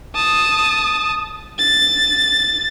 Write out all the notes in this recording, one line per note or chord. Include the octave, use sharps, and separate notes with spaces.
A5 D#6
A6